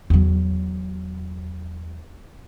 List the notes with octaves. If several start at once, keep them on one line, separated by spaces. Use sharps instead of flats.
E2 F#3